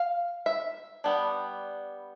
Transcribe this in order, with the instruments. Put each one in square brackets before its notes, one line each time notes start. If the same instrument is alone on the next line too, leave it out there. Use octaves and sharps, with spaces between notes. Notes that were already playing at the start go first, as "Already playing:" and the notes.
Already playing: [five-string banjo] F5
E5
G3 B3 D4